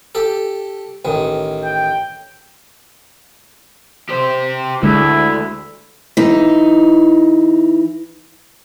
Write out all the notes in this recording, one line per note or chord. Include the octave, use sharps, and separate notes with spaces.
G4 A4
A1 D#3
G5
G4 C5
D2 D3 G#3 E4
E3 D#4